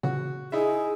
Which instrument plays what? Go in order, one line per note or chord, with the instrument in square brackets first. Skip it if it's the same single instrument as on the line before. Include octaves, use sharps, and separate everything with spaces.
[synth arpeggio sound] A#2 C#3 E3 [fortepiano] F#4
[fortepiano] D#4 E4 E5 [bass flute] G#4